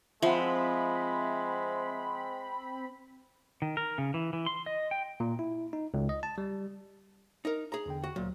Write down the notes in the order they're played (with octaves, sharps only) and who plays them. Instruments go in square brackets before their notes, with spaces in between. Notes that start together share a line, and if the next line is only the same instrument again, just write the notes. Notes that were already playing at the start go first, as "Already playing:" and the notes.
[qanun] F3 [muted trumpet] G#3 [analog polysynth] C4 B5 [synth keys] E5 F#5
[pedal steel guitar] D#3
A#4
C#3
E3
E3
C6
D#5
G5
[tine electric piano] A#2
E4
D#4
C#2
D#5
A5
G3
[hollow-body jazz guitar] D#4 A#4
G#4 A#5
[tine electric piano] E2 D3 G5
[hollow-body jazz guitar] F#4
[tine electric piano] D2 F#3 [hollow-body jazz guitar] A#2